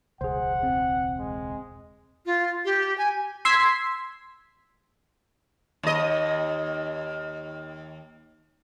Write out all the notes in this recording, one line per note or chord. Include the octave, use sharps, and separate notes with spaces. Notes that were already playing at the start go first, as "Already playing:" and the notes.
E1 C#2 G#4 C5 F#5
C4
G#3
F4
G4
G#5
C6 E6 G#6 B6 C7
D#2 D#5